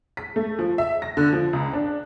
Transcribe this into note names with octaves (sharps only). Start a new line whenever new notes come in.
B6
A3
F3
E5
A#6
D3
F3
C#2
D4